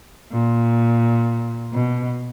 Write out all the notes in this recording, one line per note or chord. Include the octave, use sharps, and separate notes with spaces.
A#2
B2